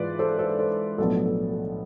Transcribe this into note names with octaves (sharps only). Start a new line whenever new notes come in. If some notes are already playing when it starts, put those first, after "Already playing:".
Already playing: G#2 E3 F4 B4 D5
A4 C5
A4 C5
A4 C5
B1 A2 F3 B3 D4 A4
A4
A4